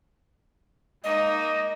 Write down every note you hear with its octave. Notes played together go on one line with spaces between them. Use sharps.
G#3 A#3 D#4 D#5